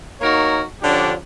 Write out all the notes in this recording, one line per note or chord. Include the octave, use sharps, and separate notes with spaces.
A#3 D#4 F#4 A#4 C#5
D3 F3 C#4 D4 G4